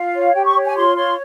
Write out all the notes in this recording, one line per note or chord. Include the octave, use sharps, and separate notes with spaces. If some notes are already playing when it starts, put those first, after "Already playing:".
Already playing: F4 F5
C#5
G4 G5
C#6
C#5
G#5
F4 C6
C#5 C6